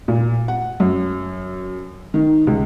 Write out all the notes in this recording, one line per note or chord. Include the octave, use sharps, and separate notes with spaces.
A#2
F#5
F#2
D#3
C#2